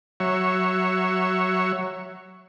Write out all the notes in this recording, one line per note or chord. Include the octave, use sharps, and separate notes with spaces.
F#3 C#5 E5